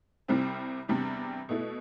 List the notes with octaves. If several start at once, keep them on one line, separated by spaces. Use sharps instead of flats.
C2 C3 G3 C4 E4
E2 C3 G3 D4
B2 A3 E4